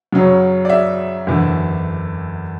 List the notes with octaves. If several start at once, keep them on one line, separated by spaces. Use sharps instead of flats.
F#2 C#3 F#3 C#4
D5
E5
F#1 E2 D3